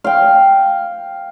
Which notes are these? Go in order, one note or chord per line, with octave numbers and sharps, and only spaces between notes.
F5 G5